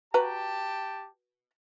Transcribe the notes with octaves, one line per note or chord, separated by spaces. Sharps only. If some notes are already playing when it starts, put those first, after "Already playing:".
F#4 G4 B4 G5 A5 A#5